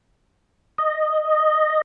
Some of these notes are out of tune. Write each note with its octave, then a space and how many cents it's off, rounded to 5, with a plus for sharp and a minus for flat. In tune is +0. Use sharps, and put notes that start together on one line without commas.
D#5 -10